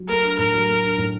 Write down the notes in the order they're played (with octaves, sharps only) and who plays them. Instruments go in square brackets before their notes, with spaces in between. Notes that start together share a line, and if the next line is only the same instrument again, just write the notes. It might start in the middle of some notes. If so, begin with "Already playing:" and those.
Already playing: [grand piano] F#3
[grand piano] A3 [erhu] A#4
[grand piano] D4
[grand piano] A2 [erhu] A#4
[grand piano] F#3
A3
D4
A2